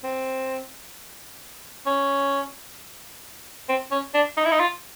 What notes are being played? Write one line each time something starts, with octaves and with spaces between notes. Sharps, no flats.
C4
C#4
C4
C#4
D4
D#4
E4
D#4
F4